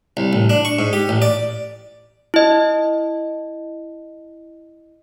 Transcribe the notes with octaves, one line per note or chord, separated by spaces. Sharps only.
C2
A1
D4
C#6
G#2
G4
A1
D5
E4 D#5